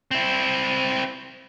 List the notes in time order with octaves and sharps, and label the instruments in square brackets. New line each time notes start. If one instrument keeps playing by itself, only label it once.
[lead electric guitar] C4 E4